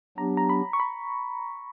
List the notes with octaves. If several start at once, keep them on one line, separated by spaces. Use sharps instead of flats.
F#3 B3 D4 G4 A#5
A#5
B5
C#6
B5